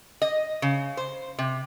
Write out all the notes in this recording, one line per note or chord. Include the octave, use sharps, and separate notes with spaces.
D#5
C#3
C5
C3